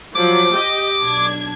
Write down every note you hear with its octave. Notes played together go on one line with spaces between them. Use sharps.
F3 F#3 D6
G4 D#5
B1 D4 G#6